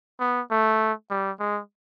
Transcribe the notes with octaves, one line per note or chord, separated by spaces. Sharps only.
B3
A3
G3
G#3